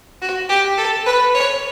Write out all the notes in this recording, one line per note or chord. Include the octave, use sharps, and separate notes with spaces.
F#4
G4
A4
B4
C#5